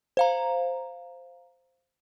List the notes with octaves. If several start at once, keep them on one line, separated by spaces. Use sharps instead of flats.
C5 F5 A#5